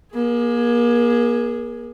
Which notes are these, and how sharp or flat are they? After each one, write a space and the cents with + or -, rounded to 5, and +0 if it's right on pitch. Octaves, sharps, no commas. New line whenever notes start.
A#3 +35 G#4 +0